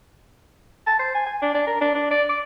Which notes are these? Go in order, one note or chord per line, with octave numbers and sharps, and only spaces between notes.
A5
C5
G#5
G#5
D4
D4
A#4
D4
D4
D5
D6